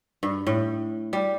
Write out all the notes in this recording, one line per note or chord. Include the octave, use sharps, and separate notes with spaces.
G2
A2
G3